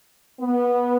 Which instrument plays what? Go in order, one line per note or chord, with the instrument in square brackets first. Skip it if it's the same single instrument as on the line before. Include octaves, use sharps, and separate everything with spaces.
[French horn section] B3